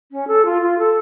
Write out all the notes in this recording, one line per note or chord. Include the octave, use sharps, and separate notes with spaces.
C#4
A4
F4
F4
A4